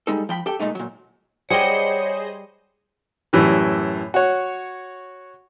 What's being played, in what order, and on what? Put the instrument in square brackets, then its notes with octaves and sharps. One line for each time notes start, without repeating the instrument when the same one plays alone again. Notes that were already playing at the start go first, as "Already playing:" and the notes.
[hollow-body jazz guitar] G3 G#3 D#4 A4
F3 G5 B5
G4 A4 G5
A#2 G#3 A3 D#4
A#2 F#3
[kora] G3 [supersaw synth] G#4 C5 D#5 [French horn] C#5 [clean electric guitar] F#5 G5
[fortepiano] F#2 A2 E3 G3
F#4 C#5